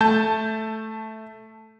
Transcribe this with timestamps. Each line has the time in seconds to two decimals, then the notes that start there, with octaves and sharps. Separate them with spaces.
0.01 A3 A5 G6